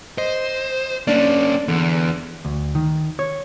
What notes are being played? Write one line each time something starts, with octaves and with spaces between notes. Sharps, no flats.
C5 D#5
A#3 C#4 D4 D5
E2 D3
D2
D#3
C#5